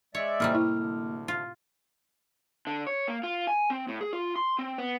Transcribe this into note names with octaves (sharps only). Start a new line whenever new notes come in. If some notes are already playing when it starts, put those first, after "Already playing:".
G#3 C#5 D5 E5
A2 C3 G3 A#3 F6
E4
D2
F4
D3
C#5
A#3
F4
G#5
C4
A2
G#4
F4
C6
C4
B3